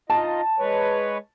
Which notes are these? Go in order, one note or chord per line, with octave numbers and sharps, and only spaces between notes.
D#4 F4 D#5 A5
G#3 B4 C#5